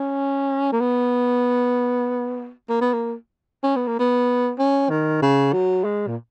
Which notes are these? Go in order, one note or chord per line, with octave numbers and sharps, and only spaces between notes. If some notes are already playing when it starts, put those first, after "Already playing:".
Already playing: C#4
A#3
B3
A#3
B3
A#3
C#4
B3
A#3
B3
C#4
D#3
C#3
F#3
G#3
A#2